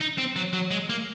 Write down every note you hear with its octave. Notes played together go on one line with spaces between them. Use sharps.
D#4
C4
F#3
F#3
G#3
A#3